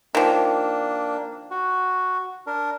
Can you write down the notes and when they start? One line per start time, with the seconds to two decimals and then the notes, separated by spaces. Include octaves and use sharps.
0.15 D#3 F3 A#3 D4
1.51 F#4
2.47 D4 A#4